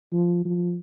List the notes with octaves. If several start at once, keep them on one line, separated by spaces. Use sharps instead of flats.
F3
F3